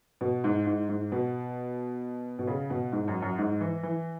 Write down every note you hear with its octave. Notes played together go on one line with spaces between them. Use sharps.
B2
G#2
G#2
G#2
B2
B2
C#3
B2
G#2
F#2
F#2
G#2
E3
E3